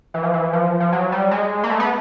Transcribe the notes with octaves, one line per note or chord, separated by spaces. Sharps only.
E3
F3
E3
F3
F3
F#3
G3
G#3
A#3
A3
B3